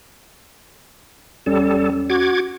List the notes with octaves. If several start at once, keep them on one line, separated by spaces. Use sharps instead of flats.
E2 G3 C#4 A4
F#4 D6 G#6